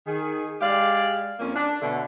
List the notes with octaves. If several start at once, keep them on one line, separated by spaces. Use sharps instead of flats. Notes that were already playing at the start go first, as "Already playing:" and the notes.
D#3 G#4
G#3 G4 D5 F5
F2 A#3 C#4
D4
B2 D3 F#3 A3